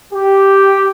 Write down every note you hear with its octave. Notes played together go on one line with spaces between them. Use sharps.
G4